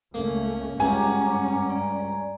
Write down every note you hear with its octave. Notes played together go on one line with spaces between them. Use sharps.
C#2 A3 A#3 C#4
C#2 G2 G3 C#4 F#5 G#5 A#5 D6
D5 A#5